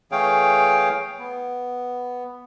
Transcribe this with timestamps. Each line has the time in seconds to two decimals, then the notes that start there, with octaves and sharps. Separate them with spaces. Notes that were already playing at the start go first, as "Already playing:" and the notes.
0.12 E3 A3 G#4 C#5 F5 G5
1.19 B3